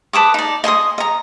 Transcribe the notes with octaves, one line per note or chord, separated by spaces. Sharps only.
B4 A5 D6 D#6
D#4 D5
D#5 G#5 C6 D#6
D#5 A#5